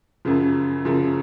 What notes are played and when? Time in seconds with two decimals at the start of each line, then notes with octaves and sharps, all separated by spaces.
0.25 F#2 C#3 F3
0.85 F#2 C#3 F3